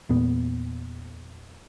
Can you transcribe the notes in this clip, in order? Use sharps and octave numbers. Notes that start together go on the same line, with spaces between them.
E2 A#2 B3